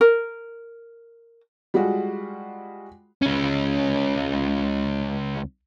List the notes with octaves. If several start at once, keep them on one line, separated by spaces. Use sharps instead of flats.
A#4
G3 G#3 F4 F#4
C#2 C#4